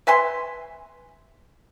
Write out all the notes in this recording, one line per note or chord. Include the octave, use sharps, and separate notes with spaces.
B4 E5 G#5 C6